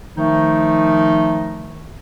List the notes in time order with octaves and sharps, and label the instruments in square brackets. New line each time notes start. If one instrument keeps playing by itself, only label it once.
[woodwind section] D#3 F3 A3 D#4